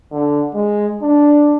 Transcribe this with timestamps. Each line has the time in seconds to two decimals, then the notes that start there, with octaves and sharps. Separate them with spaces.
0.12 D3
0.54 G#3
1.02 D4